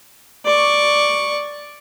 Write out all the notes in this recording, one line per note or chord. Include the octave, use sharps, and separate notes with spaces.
D5 C#6